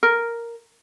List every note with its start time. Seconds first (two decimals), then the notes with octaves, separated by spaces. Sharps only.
0.03 A#4